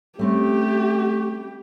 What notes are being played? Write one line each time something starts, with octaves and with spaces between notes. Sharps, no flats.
G3 A3 C4 C#4 G4